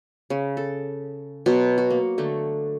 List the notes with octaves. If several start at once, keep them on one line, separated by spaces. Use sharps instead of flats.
C#3
A4
B2 F#3 C6
F#4
A#3
D3 A3